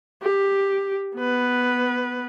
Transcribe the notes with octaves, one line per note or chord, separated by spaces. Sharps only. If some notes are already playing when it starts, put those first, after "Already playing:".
G4
B3 B4